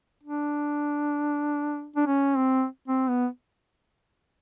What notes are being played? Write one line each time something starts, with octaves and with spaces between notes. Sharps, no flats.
D4
D4
C#4
C4
C4
B3